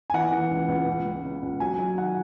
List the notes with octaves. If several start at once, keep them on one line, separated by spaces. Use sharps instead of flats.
G#5
E3 F#5
E3
C#2
C#2
C#2
C#2
C#3
C#2
F#3 G#5
F#3
D#3 F#5